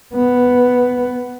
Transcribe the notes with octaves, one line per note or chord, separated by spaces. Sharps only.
B3